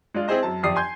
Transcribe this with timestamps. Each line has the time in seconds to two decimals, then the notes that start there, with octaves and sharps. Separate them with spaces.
0.14 G#3 D4 F4
0.28 C4 E4 G#4 C5 D#5
0.43 F#2 A5
0.63 G1 F2 G4 D5 D#6 C7
0.76 G#5 C6 G6 G#6